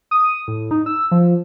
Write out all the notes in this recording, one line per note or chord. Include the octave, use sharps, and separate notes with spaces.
D#6
A2
D#4
E6
F3